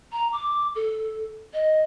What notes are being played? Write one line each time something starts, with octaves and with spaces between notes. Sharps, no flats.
A#5
D6
A4
D#5